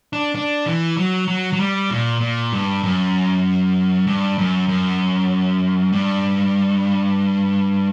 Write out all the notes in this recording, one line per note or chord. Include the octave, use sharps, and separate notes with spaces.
D4
D4
E3
F#3
F#3
F#3
G3
A#2
A#2
G2
F#2
G2
F#2
F#2
G2